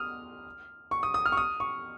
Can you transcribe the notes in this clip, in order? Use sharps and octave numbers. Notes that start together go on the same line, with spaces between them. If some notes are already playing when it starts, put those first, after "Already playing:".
Already playing: D#6 F6
C#6
D#6
D#6
F6
C#6
D#6
C#6